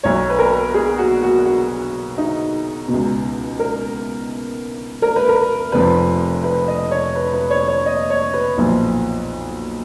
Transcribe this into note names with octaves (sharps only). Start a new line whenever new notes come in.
B1 B2 C#5
B4
A#4
G#4
F#4
F#4
F#4
D#4
B2
C#2
A#4
A#4
B4
A#4
F1 F2 F3 B4
B4
D#5
C#5
B4
B4
C#5
C#5
D#5
C#5
B4
B1 A#2 F3